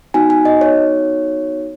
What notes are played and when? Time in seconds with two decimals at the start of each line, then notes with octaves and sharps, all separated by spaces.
0.14 B3 D#4 F#4 G#5
0.30 G#5
0.45 D#5
0.61 C#5